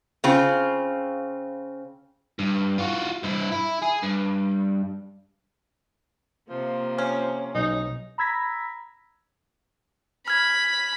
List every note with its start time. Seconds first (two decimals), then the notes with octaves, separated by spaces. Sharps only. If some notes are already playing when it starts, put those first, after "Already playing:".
0.24 C#3 C4 F4
2.39 G2
2.78 F4 F#4
3.24 G2 E4
3.52 E4
3.82 G#4
4.03 G2
6.50 C3 F3 A#3
6.98 C#4
7.55 B1 D#4
8.18 A#5 B5 E6 G#6 A#6 B6
10.28 B5 F6 G#6